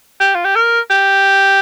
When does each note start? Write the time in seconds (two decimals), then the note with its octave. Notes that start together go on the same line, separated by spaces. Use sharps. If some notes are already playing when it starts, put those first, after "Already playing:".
0.21 G4
0.34 F4
0.45 G4
0.56 A#4
0.90 G4